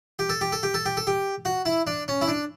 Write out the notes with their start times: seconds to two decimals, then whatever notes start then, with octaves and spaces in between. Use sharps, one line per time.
0.19 G4
0.29 A4
0.41 G4
0.52 A4
0.63 G4
0.74 A4
0.86 G4
0.97 A4
1.07 G4
1.45 F#4
1.65 E4
1.87 D4
2.08 C#4
2.21 E4
2.28 D4